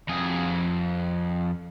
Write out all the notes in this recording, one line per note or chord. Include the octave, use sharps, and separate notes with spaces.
F2 G#4